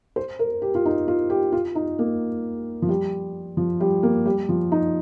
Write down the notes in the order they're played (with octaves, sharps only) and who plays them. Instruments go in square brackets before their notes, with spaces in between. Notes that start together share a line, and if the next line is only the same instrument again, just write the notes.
[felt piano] C5
A#4
G4
F4
D#4
F4
G4
F4
D#4
A#3
F3
G3
F3
G3
A#3
G3
F3
D#4